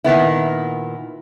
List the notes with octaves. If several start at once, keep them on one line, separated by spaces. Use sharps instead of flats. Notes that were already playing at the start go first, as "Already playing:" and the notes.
A#2 D#3 B3 E4